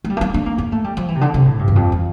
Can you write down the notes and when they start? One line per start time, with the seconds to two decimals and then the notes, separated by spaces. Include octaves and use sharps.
0.04 A3
0.10 G3
0.17 A3
0.21 A#3
0.34 D4
0.46 A#3
0.58 A#3
0.72 A3
0.84 G3
0.97 F3
1.08 E3
1.15 C3
1.21 D3
1.34 C3
1.45 A2
1.59 G2
1.68 E2
1.76 F2
1.92 E3